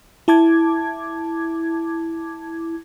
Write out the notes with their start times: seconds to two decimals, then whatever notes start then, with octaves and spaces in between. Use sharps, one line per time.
0.28 E4 A5 D6 G#6